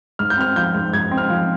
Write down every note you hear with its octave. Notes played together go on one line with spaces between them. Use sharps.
G#2 F6
G6
C4 F6
F3 G6
G#2
G#2 G#6
C4
F6
F3